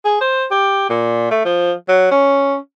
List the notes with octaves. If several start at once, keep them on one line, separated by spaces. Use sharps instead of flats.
G#4
C5
G4
A#2
A3
F3
F#3
C#4